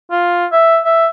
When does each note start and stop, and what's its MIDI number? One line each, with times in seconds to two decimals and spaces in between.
0.11 0.46 65
0.52 0.79 76
0.85 1.07 76